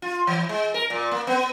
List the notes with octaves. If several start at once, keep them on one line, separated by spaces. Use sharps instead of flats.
F4
E3
G#3
A#4
A#2
A#3
B3